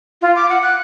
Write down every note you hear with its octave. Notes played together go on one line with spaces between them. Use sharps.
F4
D6
F#5
F#6